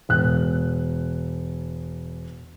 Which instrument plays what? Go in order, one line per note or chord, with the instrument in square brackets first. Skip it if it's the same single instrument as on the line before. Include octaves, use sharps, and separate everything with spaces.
[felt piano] E1 F#6